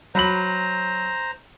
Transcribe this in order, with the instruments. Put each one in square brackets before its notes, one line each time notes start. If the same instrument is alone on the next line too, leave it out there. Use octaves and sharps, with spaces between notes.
[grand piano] F#3 B5 F#7 [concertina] C5 A#5